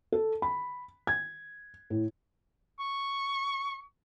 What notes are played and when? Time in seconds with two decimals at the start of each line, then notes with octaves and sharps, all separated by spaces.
0.12 A4
0.42 B5
1.07 G#6
1.90 A2
2.79 C#6